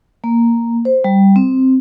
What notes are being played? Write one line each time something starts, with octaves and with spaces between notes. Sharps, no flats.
A#3
C5
G3
C4